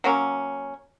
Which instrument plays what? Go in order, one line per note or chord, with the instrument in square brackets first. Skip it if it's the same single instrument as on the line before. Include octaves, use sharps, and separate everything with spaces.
[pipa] F#3 A#3 C#4